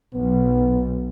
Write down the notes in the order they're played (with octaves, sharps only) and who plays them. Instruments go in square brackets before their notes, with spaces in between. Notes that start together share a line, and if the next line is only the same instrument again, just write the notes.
[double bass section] B1 [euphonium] B3